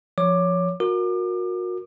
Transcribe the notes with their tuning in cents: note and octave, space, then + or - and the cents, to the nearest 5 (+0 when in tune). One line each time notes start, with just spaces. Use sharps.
F3 +0 C#5 +15 D6 +15
F#4 -30 A#4 +0 D6 +35